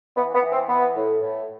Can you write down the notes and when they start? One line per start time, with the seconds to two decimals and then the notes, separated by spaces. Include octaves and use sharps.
0.17 E3 B3
0.34 B3
0.42 E3
0.51 C4
0.69 E3 B3
0.95 A2
1.21 A2